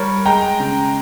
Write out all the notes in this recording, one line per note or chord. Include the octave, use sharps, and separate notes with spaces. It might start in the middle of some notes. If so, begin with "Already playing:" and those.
Already playing: G3 A#4 C#5
G#3 G5 A#5
C#3